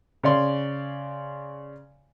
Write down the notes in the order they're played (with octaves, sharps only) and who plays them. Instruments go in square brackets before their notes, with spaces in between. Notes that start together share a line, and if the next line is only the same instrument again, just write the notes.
[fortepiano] C#3 C#5 D5 C6